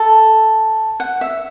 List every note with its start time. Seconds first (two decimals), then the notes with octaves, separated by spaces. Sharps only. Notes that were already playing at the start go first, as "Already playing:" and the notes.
Already playing: A4
1.00 F#5
1.21 E5